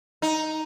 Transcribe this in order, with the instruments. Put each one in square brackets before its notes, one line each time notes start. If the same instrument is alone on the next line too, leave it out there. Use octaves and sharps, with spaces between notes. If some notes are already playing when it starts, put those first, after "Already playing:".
[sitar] D#4